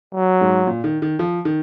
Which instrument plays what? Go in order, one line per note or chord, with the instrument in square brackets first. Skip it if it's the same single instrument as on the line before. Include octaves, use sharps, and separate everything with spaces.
[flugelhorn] F#3
[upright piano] G#2
A#2
D#3
D#3
F3
D#3